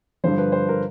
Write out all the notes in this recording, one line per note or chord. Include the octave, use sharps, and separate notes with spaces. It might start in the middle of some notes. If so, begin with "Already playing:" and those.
G2 D3 F3 C5
B4
C5
A#4